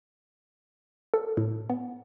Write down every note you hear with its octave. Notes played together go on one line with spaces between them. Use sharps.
A4
A2
B3